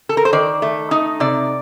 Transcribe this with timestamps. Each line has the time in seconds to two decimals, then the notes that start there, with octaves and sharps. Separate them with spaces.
0.09 A4
0.17 A#4
0.25 C5
0.33 D#3 D5
0.62 A3
0.91 D#4
1.20 C3 D5